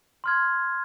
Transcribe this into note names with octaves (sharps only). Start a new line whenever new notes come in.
C6 F6 G#6